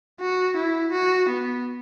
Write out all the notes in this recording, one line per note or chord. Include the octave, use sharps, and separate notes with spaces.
F#4
E4
F#4
B3